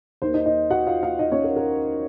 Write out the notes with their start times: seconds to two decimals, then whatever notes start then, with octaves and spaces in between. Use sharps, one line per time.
0.22 D#2 D#3 A#3 C5
0.34 D#4 D#5
0.46 D#4 D#5
0.70 F#4 F#5
0.87 F4 F5
1.03 F4 F5
1.19 D#4 D#5
1.31 C#4 C#5
1.44 A#4
1.56 A#4